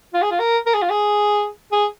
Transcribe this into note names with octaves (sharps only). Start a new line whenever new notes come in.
F4
G#4
F4
A#4
A#4
G#4
F4
G#4
G#4